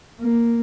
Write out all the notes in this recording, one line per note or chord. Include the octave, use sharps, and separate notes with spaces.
A#3